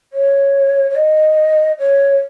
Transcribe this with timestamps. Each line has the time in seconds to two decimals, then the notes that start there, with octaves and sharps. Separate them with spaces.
0.13 C#5
0.90 C#5
0.96 D#5
1.79 C#5